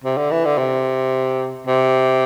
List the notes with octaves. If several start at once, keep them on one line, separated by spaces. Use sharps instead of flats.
C3
D3
E3
D3
C3
C3